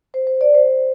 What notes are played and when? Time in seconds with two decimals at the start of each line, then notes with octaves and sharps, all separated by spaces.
0.14 C5
0.27 C5
0.41 D5
0.54 C5